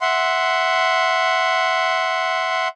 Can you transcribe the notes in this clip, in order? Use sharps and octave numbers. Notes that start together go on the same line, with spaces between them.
E5 F#5 C6